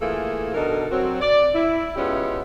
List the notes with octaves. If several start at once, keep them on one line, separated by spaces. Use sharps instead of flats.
E3 A3 A#3 F4 G#4 A4
B2 D3 D4 D#4 A4 A#4
F#3 C4 F#4
D5
E4
G#3 B3 C#4 E4 F4 G4